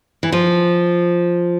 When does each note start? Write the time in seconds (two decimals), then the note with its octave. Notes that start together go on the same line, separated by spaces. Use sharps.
0.23 E3
0.32 F3